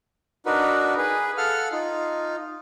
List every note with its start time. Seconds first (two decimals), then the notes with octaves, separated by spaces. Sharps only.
0.46 D4 D#4 F#4 A#4 B4
0.98 G#4 B4
1.37 A4 F5 F#5 F6
1.72 D#4 F4